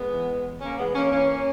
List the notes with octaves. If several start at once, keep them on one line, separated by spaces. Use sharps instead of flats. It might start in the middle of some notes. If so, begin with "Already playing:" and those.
Already playing: G#3 B3
E3
E2
E2
C#3 A#3 C#4
E3 G#3 B3
E2 A#3 C#4
E3 A#3 C#4